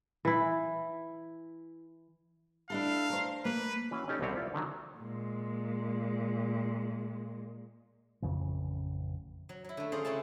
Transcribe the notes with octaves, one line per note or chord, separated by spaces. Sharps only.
E3 E4
D4 E4 A4 F5
A#4 C5
A#3 B4
E3 C#4 F#4
C#4 D#4 G4 A4 C#5 D5
C2 B2 G3 C4 C#5
E4 F4 D5 E5
D3 D#3 F#3
A#2 G#3
A1 F2 C#3 E3
F#3
F#3 E4
D3 A3
C#4 F4 G#4 C5 D5 A#5
C#3 A3 C4 C#4 E4 A5